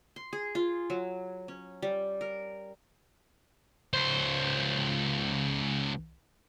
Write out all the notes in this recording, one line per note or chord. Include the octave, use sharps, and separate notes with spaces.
C6
G#4
F4
F#3
C#4
G3
A#4
C#2 C5